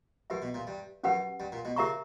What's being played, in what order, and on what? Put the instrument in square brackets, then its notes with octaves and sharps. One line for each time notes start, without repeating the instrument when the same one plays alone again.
[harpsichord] F#2 [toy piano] G4 B4 E5
[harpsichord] B2
A#2
G2
[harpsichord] F#2 [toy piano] C#4 G4 B4 F#5
[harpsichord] G2
A#2
B2
[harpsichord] C#3 [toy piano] G4 A#4 E5 A#5 C#6